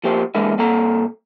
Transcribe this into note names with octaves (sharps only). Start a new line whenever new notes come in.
F3 A#3 G4 C5
D3 E3 G#3 A#3 B3 E4
C2 A#3 A4 A#5